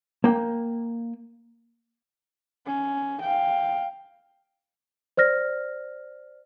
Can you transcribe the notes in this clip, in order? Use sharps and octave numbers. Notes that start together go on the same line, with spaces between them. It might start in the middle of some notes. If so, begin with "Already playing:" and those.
A#3 G5
C#4
F5 G5
C5 D5 F6 A#6